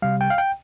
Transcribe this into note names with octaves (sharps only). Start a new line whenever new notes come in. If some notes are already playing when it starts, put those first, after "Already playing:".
C3 G3 F5
G5
F5
G5